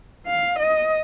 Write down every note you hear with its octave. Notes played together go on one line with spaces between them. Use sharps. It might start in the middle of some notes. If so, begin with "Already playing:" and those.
F5
D#5